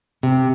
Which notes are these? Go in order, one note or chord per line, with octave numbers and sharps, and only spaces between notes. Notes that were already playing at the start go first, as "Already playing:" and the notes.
C3